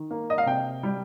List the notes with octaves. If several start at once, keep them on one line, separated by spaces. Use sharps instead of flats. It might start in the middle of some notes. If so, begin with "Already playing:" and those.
Already playing: D#3
A#3
D#5
F5
C3 G5
G3